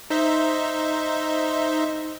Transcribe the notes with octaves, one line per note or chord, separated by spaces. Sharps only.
D#4 C5 E5